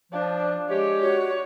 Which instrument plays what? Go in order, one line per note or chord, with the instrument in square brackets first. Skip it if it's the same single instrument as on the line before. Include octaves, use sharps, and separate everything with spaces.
[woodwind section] F3 [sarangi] D4
[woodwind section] G#3 G4 [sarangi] C#5
[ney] F#4 [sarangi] C#5